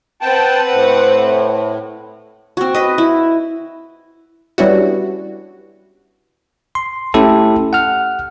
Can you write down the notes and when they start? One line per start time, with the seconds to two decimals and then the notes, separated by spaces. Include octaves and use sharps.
0.21 C4 B4 F#5 G5 A5
0.72 A2
2.57 C4 F#4
2.74 B4 D#5
2.98 E4
4.58 G3 B3 C#4 D4 E4 F#4
6.75 C6
7.14 A3 C#4 E4 G4 A4
7.73 F#5 F6